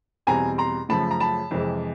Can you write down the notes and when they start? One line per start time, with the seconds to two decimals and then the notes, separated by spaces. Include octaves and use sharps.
0.27 E2 B2 G3 C4 G#5 A#5
0.58 A#5 C6
0.89 F#2 C#3 F3 A3 A5 B5
1.11 A#5
1.20 A5 B5
1.51 F2 C3 E3 G#3